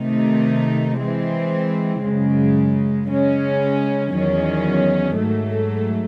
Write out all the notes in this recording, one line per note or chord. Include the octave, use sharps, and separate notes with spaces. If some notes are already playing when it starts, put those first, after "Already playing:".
Already playing: C3 D#3 A3 D#4
E3 G#3 C4
F#2 C#3 G#3
C#3 G#3 C#4
E2 D#3 F#3 C#4
G#2 F#3 A3